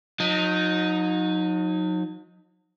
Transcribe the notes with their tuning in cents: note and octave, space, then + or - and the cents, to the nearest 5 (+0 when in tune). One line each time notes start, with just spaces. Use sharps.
F#3 -40 D#4 +0